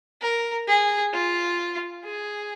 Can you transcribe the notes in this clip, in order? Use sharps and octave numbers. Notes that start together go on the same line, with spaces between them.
A#4
G#4
F4
G#4